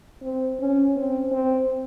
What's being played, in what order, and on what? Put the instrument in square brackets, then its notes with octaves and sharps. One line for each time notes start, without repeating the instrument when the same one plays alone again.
[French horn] C4
C#4
C4
C4